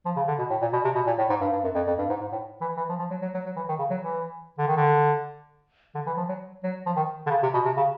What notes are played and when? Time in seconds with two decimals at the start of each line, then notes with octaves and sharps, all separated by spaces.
0.06 F3
0.17 C#3
0.28 D3
0.38 B2
0.50 A2
0.62 A#2
0.73 B2
0.85 C3
0.95 B2
1.07 A#2
1.19 A2
1.30 G#2
1.41 G2
1.53 G2
1.64 F#2
1.75 F2
1.87 F2
1.98 G2
2.09 G#2
2.21 G#2
2.32 A2
2.62 E3
2.77 E3
2.89 F3
2.99 F3
3.11 F#3
3.22 F#3
3.34 F#3
3.46 F#3
3.56 E3
3.69 D#3
3.79 C#3
3.91 F#3
4.02 E3
4.58 D3
4.67 D#3
4.77 D3
5.95 D3
6.06 E3
6.17 F3
6.29 F#3
6.64 F#3
6.86 F3
6.96 D#3
7.26 D3
7.30 C#3
7.43 C3
7.54 B2
7.65 C3
7.77 C#3